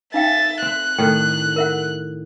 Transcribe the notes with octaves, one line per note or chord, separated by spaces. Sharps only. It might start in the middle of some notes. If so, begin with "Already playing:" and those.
D#4 E5 F5 G5 A6
C4 F#6
A2 D#3 G5
A#4 E5 F#5